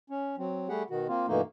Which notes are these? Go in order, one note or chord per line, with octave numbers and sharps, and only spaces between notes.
C#4
F#3 C4
G3 A3 G4 G#4 F#5
B2 D#3 F#4
A#3 C4 F4
G2 B2 E3 A3 A#3 D#4